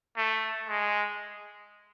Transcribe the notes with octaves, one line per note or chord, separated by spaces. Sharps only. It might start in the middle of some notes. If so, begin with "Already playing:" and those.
A3
G#3